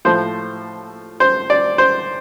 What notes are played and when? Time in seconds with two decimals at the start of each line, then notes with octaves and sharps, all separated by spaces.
0.05 A2 F3 A3 C5
1.20 C5
1.50 D5
1.78 C5